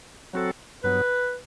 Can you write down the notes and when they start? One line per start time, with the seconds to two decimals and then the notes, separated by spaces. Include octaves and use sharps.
0.33 F#3 C4 F#4 A4
0.84 G2 F#3 B3 B4